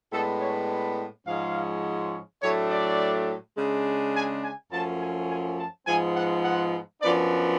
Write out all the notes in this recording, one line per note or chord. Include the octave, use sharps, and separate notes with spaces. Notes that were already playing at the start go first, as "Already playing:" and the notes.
A2 G#3 B3 D4 A4
C#5
G#2 F3 G#3 C#4 F5
A2 F#3 A3 D4 C#5
D5
C#3 G#3 D4
G#5
G#5
F#2 F3 A3 C#4 A5
G#5
G#5
A5
G#2 F3 G#3 B3 G#5
F#5
F#5
F#2 F3 B3 D4 D5